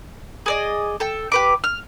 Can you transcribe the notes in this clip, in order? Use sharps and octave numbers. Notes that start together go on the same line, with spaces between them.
G#4 D5 D#5
A4 G5
G4 B4 D6
F6